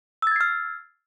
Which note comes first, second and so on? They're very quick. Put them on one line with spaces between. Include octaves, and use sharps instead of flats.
E6 A6 G#6 C7 F6